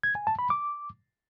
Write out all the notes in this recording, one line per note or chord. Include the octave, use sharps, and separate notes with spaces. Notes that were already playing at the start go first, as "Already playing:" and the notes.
G#6
G#5
A5
B5
D6